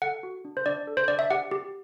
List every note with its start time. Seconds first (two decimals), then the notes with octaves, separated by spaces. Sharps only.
0.02 A4 F#5
0.23 F#4
0.45 D4
0.57 C5
0.66 D4 D5
0.87 A4
0.97 C5
1.08 D4 D5
1.19 E5
1.30 G4 F#5
1.51 G4